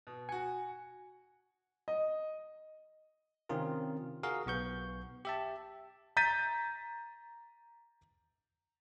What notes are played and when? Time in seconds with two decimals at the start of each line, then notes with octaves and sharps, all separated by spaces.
0.07 B2
0.29 F#4 G#5 C#7
1.88 D#5
3.49 C3 D#3 C4 C#4 F4 A#4
4.23 F#4 G#4 A#4 F5
4.46 B1 B3 C#6 G6
5.25 G4 E5 A5
6.17 A#5 G6 A6 B6 D#7